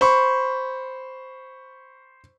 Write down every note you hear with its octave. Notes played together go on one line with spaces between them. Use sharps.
C5 B5 C#6